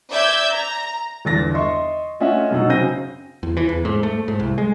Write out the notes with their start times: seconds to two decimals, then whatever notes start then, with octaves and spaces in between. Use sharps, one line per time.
0.11 D5 E5 E6 G6 G#6
0.52 A#5
1.25 G1 E2 A6 A#6
1.54 D#5 E5 C6 C#6
2.20 A3 C#4 F4 D#5 E5 F#5
2.51 F#2 B2 F#3 D#4 F#5 E6
2.69 C#3 C4 F#4 G6 A#6 D#7
3.43 E2
3.57 E3
3.69 E2
3.85 G#2
4.03 A3
4.28 G#2
4.39 C2
4.58 G#3